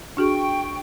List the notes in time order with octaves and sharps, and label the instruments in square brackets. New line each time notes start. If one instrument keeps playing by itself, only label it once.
[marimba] D4 F#4 G#4 [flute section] G5 C#6